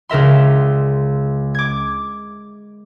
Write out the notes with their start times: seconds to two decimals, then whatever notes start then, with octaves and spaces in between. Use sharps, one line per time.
0.09 C#2 C#3 A#4 E5 C6
1.55 D6 G#6